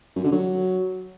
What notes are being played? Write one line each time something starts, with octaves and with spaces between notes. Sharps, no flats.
F#2
D3
F#3